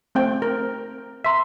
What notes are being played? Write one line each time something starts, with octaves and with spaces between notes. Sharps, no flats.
A3 C4 G5
A#4
E5 A#5 C6 B6